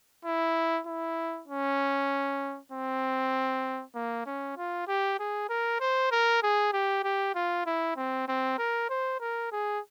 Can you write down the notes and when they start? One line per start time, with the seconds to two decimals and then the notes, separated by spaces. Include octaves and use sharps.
0.25 E4
0.87 E4
1.48 C#4
2.72 C4
3.95 A#3
4.26 C#4
4.57 F4
4.88 G4
5.19 G#4
5.49 A#4
5.80 C5
6.11 A#4
6.43 G#4
6.73 G4
7.03 G4
7.35 F4
7.66 E4
7.97 C4
8.28 C4
8.58 A#4
8.90 C5
9.20 A#4
9.52 G#4